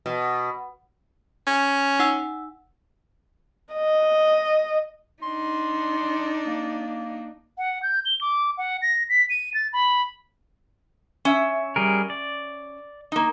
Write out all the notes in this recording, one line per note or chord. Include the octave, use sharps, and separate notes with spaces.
B2
C#4
D#4 F#5 E6
D#5
D4 D#4 C6
A#3
F#5
G6
G7
D6
F#5
A#6
B6
D#7
A6
B5
C#4 E5
G3 G#4 A#4
D5
A#3 D#4